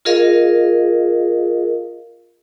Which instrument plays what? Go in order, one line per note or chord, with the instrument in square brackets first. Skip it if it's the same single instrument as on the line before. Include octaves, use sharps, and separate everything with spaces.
[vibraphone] F4 G#4 A#4 D#5 F5